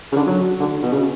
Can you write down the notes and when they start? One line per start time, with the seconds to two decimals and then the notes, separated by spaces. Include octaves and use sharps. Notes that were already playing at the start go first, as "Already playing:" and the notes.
0.12 C#3
0.16 D3
0.27 F#3
0.60 D3
0.83 B2
0.93 C#3